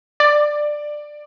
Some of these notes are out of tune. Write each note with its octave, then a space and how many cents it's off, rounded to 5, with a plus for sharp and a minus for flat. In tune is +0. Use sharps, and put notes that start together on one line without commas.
D5 +15